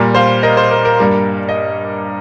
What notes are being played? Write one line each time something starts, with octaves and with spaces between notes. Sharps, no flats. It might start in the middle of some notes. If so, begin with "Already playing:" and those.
Already playing: A#2 G3 A#3
C5 F5
A#4 D#5
C5
A#4
A#4
G2 G3 A#3
D#5